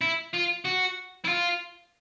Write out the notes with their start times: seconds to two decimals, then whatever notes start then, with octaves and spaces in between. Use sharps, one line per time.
0.01 E4
0.34 F4
0.65 F#4
1.25 E4
1.28 F4